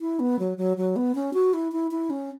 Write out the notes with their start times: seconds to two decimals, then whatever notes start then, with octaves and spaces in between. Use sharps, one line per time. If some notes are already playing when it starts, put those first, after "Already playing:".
0.01 E4
0.20 B3
0.39 F#3
0.58 F#3
0.77 F#3
0.96 B3
1.15 C#4
1.34 F#4
1.54 E4
1.72 E4
1.91 E4
2.10 C#4